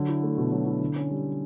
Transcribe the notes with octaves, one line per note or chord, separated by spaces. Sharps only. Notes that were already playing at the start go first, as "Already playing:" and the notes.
Already playing: D3 F#3
E4
A3
B2
F#3
E4
D3
C#4
G3